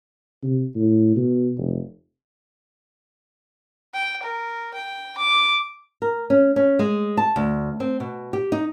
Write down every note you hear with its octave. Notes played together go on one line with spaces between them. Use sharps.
C3
A2
B2
F1
G5
A#4
G5
D6
A#4
C#4
C#4
G#3
A5
D2
C4
B2
G4
D#4